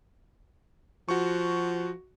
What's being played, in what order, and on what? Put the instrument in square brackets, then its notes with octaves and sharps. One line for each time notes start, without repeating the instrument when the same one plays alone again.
[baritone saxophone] F3 [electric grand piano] F#4 C#6